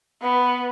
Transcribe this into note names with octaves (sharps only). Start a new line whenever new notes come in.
B3